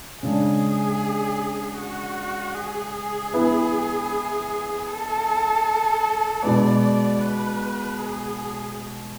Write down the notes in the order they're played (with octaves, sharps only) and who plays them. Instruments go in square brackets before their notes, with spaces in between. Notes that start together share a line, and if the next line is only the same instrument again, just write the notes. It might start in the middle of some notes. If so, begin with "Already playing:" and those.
[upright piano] C#3 G#3 D4 [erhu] G#4
[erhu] F#4
G#4
G#4
[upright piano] B3 E4 B4
[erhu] A4
[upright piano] B2 G#3 B3 [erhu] D5
[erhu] B4
G#4